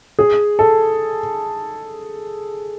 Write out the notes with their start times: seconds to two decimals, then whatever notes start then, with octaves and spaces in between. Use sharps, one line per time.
0.19 G#4
0.59 A4